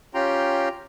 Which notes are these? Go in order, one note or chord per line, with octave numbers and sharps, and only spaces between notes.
C#4 F4 G4 G5 A#5 C6